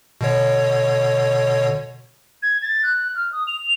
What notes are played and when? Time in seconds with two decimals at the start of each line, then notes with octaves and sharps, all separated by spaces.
0.21 B2 D3 C#5
2.43 G#6
2.62 A6
2.83 F#6
3.16 F6
3.32 D#6
3.47 F7